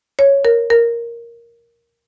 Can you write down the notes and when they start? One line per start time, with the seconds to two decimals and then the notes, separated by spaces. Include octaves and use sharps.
0.19 C#5
0.45 A#4
0.70 A#4